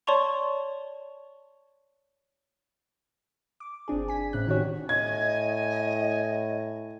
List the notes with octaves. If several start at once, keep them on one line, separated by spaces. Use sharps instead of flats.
C#5 D5 A5 C6 C#6 F7
D6
G1 C4 D4 G#4
G#5 B6
A2 C#3 C4 F#6
D#3 C4 F#4 G4 C#5
A2 D#5 G#5 G#6